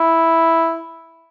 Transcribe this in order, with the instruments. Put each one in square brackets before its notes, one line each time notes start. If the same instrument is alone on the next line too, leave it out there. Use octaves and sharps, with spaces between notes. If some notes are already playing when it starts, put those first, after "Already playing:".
Already playing: [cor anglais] E4